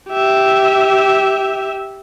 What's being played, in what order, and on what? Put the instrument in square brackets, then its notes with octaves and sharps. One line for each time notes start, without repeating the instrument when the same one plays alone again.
[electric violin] G4 E5